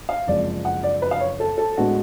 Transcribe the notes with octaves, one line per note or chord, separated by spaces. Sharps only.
F5
F#1 F2 F3 G#3 D5
F#5
D5
B4
F5
C#5
A4
A4
A2 G#3 B3 D4 F#4